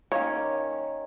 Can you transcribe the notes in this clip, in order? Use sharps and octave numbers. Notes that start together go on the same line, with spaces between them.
D#3 A#3 C#4 C#5